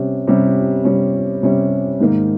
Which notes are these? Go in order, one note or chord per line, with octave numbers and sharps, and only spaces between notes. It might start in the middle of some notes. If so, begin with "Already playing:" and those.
Already playing: C3 G3 C#4
C3 G3 C#4
C3 G3 C#4
C3 G3 C#4
G#2 D#3 A#3